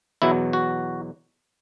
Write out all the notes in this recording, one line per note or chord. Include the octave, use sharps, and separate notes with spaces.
E2 B2 F#3 E4
F#4